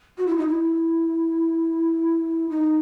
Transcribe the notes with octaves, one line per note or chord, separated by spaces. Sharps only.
F#4
E4
D#4
E4
D#4